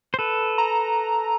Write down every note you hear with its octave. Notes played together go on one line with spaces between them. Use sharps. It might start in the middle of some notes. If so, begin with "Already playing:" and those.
C5
A4 B4
A#5